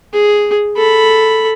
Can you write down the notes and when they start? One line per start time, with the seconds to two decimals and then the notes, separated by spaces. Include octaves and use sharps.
0.13 G#4
0.76 A4 B5